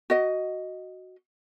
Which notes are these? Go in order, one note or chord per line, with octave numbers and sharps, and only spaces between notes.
F#4 D#5